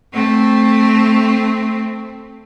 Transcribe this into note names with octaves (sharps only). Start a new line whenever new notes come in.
A3 C4